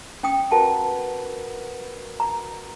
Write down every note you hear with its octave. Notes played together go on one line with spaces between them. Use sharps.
C#4 G5 D#6
F#4 A#4 B4 A5
A#5